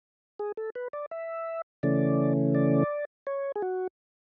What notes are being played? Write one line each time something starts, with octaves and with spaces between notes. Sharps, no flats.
G#4
A4
B4
D5
E5
C#3 E3 A3 C#4 D5
D5
C#5
G#4
F#4